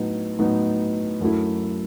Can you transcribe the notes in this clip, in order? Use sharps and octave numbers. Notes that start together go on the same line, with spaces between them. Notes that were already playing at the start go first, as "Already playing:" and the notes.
Already playing: A2 F#3 B3 D#4
A2 F#3 B3 D#4
F#2 F#3 A3 E4